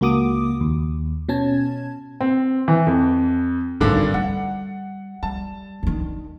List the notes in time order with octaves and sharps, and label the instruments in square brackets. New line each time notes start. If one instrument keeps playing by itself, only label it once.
[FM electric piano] C#2 A#3 F#4 D6 D#6
D#2
B2 C#4 A5 G#6
[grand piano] C4
E3
F2
[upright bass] G#1 D#4 [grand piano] G2 D3 D4
[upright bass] G3 [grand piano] F#5
[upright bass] G3 [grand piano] A5
[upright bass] D3 D#3